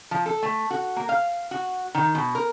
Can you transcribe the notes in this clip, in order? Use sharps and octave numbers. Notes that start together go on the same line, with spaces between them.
F3
A4
A3
F#4
A#3
F5
F#4
D#3
B2
A#4